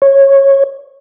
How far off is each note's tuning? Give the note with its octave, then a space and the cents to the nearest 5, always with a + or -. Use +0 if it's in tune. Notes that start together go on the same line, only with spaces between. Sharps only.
C#5 -15